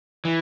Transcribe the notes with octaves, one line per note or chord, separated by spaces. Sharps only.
E3